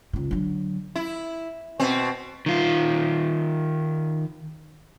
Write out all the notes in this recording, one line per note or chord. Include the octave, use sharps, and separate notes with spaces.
C#2 D#3
D3 F#3
E4
B2 C4
D#3 F4